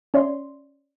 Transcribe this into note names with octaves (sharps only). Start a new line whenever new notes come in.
C#4 C#5 D5 E5 C6